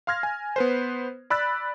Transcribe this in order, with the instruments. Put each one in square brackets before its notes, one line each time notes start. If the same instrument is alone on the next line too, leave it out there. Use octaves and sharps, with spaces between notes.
[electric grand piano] F5 C6 F6 G#6 A#6
G#5
B3 B4 C5
D5 B5 E6 F#6 A6